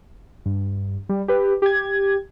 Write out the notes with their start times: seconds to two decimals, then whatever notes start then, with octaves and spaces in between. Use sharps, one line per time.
0.46 G2
1.09 G3
1.28 G4 B4
1.62 G4 G#6